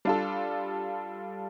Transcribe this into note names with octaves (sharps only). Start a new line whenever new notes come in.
G3 D4 F4 A4